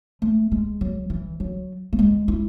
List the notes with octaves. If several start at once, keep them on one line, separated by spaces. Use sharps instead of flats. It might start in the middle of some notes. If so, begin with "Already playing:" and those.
A3
G#3
F#3
E3
F#3
A3
G#3
E4